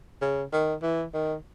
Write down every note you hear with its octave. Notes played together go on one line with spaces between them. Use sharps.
C#3
D#3
E3
D#3